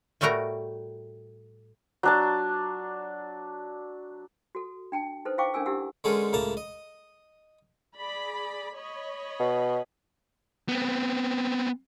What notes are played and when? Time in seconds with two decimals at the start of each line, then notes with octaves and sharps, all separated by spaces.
0.21 A2 G3 A3 F#4 A#4 A#5
2.03 F#3 D4 A5
4.55 F#4 A4
4.92 D4 G5 A5
5.25 D#4 A4 B4 C5
5.38 E4 C5 F5 G5 C#6 D6
5.54 C#4 D4 A4 A#4 G#5 E6
5.66 D4 E4 G4 F#5 E6
6.04 D3 G#3 C#4 A4 A#4 C5
6.33 C#2 A2 A#3 A5 A#5
6.57 D#5
7.96 G#4 D5 B5
8.77 C#5 D#5 B5
9.40 B2
10.68 B3 C4